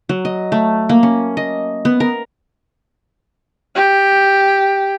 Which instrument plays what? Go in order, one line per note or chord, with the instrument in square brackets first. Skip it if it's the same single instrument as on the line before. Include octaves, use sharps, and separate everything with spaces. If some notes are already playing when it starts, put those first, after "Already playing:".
[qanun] F#3
D#5
A3
A#3
C#4
D#5
B3
A#4
[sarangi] G4